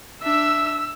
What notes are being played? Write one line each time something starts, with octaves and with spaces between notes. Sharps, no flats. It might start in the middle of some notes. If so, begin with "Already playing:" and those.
D4 E5 E6